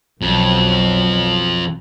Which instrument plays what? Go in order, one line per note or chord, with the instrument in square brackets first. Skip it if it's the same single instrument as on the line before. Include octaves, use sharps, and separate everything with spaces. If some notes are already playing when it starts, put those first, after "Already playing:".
[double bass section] B1 F#3 [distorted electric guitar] F2